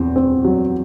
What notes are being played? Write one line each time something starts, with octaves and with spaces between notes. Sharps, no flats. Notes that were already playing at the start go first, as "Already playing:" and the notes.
Already playing: E2 C4
C4
F#3